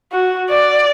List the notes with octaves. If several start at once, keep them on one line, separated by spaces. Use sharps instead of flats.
F#4
D5